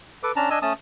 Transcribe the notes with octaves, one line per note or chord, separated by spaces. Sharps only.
A4 B4 D6
C#4 D4 A5 A#5
D4 D#5 G#5 E6
A3 C#4 A5 D#6